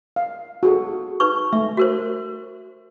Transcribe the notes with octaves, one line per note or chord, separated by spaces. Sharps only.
F5
F#4 G#4 A4
D#4 B4 C#6
A3 E5
F#4 A#4 C5